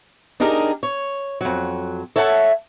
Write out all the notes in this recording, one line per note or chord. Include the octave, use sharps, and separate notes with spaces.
D4 D#4 G4 G#4 A#4
C#5
F2 F#3
A4 C#5 E5 F#5 G5 A5